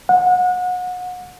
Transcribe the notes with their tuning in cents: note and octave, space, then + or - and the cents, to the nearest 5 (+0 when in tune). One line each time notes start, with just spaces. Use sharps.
F#5 -30